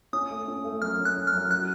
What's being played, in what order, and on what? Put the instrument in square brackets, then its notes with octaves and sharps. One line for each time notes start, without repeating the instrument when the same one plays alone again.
[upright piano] C#4 [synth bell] D#6
[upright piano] A3
C#4
A3
[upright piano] F#2 [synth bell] F6
[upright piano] C#4
[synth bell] F#6
[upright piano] C#4
[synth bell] F6
[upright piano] F#2
[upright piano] F#4 [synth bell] F#6